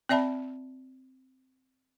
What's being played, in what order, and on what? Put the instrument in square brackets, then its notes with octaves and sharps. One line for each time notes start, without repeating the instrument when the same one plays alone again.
[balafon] C4 D5 E5 A5 B5